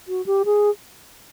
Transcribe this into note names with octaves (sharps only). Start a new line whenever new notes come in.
F#4
G4
G#4